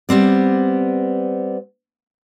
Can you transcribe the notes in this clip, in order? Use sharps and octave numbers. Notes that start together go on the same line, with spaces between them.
G3 B3 C4 D5